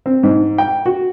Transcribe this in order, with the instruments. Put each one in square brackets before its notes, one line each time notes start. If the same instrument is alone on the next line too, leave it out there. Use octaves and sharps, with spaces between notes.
[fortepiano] C4
G#2
G5
F#4